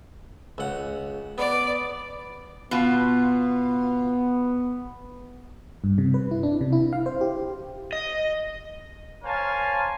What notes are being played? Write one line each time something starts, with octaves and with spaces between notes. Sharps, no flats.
C#2 F#5
B3 D5
B2 B3 F4
G2
C3
B4
E4
D4
C3
E4
F5
C5
G4
D#5
A#4 C5 C#5 F5 G#5 A5